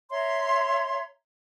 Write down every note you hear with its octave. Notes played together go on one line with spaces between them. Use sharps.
C#5 E5 A#5 C6